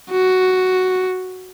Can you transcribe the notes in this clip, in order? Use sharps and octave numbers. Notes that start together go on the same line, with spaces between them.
F#4